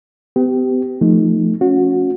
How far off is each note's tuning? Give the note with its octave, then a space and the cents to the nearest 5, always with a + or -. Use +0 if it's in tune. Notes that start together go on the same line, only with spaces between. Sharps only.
B3 +40 G4 -15
F3 +0 A3 +10 D#4 +0
C#4 +0 F#4 -25